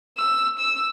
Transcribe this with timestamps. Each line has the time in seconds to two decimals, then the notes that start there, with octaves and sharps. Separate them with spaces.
0.18 E6
0.59 E6